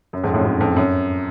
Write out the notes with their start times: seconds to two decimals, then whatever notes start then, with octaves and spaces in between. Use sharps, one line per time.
0.13 F#2
0.23 F2 G#2
0.34 F#2 A2
0.45 F#2
0.60 F2
0.76 F#2